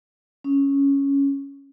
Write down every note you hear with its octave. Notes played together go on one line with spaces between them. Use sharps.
C#4